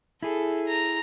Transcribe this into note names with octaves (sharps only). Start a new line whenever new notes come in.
E4 G#4 A4
A#5